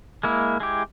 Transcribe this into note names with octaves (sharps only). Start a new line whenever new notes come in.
G#3 A#3 E4
G#3 E4 G4